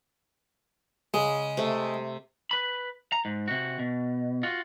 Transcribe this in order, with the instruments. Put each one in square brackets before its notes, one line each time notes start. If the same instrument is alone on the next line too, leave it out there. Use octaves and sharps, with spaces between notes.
[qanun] C#3 [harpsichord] G#3
[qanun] C3 A3
[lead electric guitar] B4 B5
A#5
G#2
C3 F#4
B2
F4 F#4